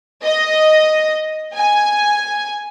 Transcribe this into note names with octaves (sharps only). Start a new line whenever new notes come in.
D#5
G#5